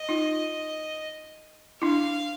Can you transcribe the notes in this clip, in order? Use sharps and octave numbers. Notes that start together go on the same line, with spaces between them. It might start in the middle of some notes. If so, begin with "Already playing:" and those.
Already playing: D#5
D#4 F4
D4 E4 F5